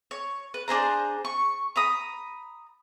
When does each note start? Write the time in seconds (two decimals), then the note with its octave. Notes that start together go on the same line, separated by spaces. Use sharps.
0.11 C#5
0.54 B4
0.68 D4 G#4 C5 A#5
1.25 C#6
1.76 A#5 B5 D#6